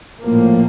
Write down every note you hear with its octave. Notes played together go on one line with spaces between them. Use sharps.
A#1 A2 F3 A#3